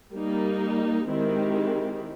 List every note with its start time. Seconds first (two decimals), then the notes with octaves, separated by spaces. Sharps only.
0.12 G3 A#3 D#4
1.06 D#3 G#3 C4 E4 G4